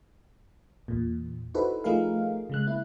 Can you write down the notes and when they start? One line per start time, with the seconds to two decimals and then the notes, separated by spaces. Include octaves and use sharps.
0.88 E2 A#2
1.54 D#4 E4 F#4 A4 B4 C5
1.84 F3 A3 D#4 G#4 A#4 F5
2.50 C#3 G#3 F#6
2.67 A#3 E4